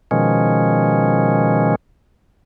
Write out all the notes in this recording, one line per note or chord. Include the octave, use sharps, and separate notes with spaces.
B2 D#3 F3 G#3 C#4